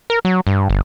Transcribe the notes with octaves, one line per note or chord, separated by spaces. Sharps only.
A#4
F#3
G2
G1